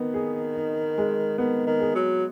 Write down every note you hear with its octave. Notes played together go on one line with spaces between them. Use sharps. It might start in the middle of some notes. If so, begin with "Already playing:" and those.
Already playing: D#3 B3
G#4
D#4
G#3
D#3 B3
D#3
G#4
F#3